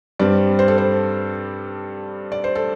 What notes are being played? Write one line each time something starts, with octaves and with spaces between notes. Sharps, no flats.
G2 G3 C4 D5
C5
A4
C5
D5
C5
A4